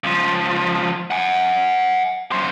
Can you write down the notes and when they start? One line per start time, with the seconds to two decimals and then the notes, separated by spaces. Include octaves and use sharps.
0.04 C#2 F3
1.11 F#5 G#5
2.32 F#2 C5